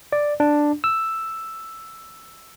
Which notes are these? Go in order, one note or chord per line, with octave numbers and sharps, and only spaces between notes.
D5
D4
E6